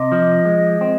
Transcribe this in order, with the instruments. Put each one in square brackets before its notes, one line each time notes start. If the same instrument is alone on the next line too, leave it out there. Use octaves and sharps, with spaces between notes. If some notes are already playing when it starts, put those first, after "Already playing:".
Already playing: [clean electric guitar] C3 [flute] D#5
[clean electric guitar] F3
G#3
C4